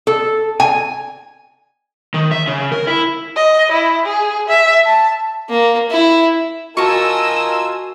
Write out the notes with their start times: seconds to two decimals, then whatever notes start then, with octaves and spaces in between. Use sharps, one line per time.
0.07 A4
0.60 G#5
2.14 D#3
2.31 E5
2.47 C#3
2.72 A#4
2.87 E4
3.36 D#5
3.72 E4
4.05 G#4
4.48 E5
4.86 A5
5.49 A#3
5.91 E4
6.77 F4 F#4 A#4 D#5 G#5 A5 C#6 E6